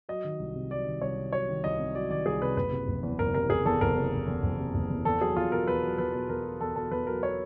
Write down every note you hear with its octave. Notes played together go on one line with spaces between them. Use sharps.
F#3 D#5
D#3
C2
C3
F#3 D5
D#3
C2 C#5
C3
F#3 C#5
D#3
C2 D#5
C3
F#3 D5
D#3 D5
C2 G#4
C3 B4
F#1 B4
C3
F#1
E2
F#1 A#4
C3 A#4
F#1 G#4
E2 A4
F#1 A#4
C3
F#1
E2
F#1
C3
F#1
E2
E2 A4
F#3 G#4
E2 F4
B2 A#4
E2 B4
F#3
E2 B4
B2
E2 A#4
F#3
E2 A4
B2 A4
E2 B4
F#3 A#4
C#5